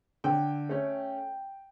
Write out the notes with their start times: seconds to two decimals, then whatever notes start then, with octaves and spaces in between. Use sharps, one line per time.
0.24 D3 G5
0.69 A3 C#4